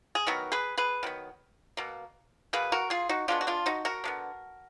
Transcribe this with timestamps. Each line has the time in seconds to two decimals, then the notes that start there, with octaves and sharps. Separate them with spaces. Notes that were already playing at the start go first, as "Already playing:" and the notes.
0.15 G#4
0.27 D#3 F#3 B3 F#4 A#4
0.52 G#4 B4
0.77 G#4 B4
1.03 D#3 F#3 B3
1.77 B2 A#3
2.53 B2 A#3 G#4 B4
2.72 F#4 A#4
2.90 F4 G#4
3.09 D#4 F#4
3.28 D3 G#3 B3 D4 F4
3.41 F#4
3.47 D4 F4
3.66 D#4 F#4
3.85 F#4 A#4
4.04 D3 G#3 B3